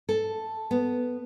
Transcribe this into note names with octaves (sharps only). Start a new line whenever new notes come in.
A4
B3